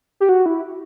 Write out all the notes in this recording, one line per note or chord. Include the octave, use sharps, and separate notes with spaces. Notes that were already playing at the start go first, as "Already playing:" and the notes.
G4
F#4
E4